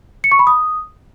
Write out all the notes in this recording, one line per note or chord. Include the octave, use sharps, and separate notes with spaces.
C#7
C#6
B5
D#6